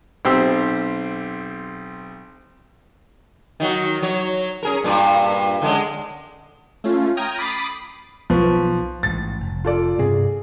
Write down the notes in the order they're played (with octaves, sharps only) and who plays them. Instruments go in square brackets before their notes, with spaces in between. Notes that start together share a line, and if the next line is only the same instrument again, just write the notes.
[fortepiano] B1 C4 G4 C5 E6
[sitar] D#3 F#3 F#4
F#3 C#5
C#4 G#4 A#4
G2 A#2
D3 G#3 C#4
[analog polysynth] A3 C#4 F4
G5 A#5 D#6 F6 G#6
B5 D6 D#6 A6 B6 C7
[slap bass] B1 [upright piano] F3 B4 C#6
[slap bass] A1 G#2 [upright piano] A6
[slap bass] F1
[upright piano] F4 A4 D5
[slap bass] G2 C3 C4 [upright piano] G#4